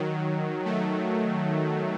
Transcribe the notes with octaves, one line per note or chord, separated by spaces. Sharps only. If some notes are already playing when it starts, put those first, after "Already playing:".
Already playing: D#3 F#3
A3